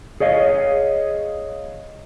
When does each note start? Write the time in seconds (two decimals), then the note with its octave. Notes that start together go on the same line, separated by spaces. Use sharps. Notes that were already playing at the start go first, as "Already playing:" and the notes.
0.20 G#4 C#5 D#5 F5